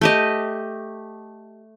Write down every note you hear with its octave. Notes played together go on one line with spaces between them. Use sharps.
A3 G4 D#5